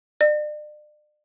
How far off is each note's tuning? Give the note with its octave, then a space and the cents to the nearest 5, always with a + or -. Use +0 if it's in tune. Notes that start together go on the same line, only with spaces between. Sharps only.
D5 +40